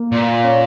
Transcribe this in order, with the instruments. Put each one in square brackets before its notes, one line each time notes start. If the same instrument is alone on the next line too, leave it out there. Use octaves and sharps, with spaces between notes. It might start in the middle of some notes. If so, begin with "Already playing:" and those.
Already playing: [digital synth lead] A#3
[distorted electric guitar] A#2
[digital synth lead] C#4